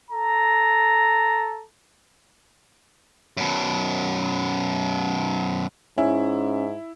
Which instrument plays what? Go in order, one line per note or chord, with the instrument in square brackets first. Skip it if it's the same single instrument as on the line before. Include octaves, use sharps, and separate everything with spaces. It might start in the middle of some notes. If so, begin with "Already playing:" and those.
[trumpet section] A4 A#5
[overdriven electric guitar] F#2 B2
[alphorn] G#2 [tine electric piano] C#4 [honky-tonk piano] E4